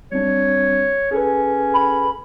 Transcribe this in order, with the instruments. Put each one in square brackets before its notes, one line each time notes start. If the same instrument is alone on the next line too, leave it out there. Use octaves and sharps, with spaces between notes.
[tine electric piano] G3 C4 D4 [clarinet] C#5
[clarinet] C#4 [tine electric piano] G#4 A4 B4
[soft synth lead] B5